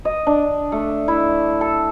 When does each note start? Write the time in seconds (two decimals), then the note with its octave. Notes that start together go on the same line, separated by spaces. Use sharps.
0.05 D#5
0.27 D4
0.72 A3
1.08 E4
1.61 A4